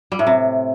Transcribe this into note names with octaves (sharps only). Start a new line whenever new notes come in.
G3
A2
C3